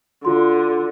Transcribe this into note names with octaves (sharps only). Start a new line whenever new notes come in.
D3 F4 F#4 C6